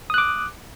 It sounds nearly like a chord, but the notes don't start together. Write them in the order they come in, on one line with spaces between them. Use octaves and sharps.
D#6 F#6 D6